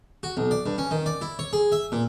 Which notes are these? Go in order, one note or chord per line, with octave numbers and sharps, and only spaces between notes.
F#4
B1
D5
G2
C#4
D#3
D5
E4
C#5
G#4
E5
A#2